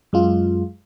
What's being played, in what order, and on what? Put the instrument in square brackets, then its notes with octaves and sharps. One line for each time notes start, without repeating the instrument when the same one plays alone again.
[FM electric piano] F#2 G#3 F4